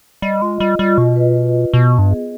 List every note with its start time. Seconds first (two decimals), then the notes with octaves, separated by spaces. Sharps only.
0.22 G3 D#5
0.42 G#3 F4
0.60 G3 D#5
0.79 G3 F4
0.98 B2 F4
1.16 B4
1.35 B4
1.54 D#5
1.73 B2 B3
1.92 B3
1.98 G2
2.10 G#4